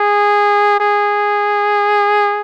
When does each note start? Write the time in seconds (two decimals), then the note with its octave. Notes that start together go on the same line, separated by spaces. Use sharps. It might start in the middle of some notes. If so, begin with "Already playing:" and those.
Already playing: G#4
0.80 G#4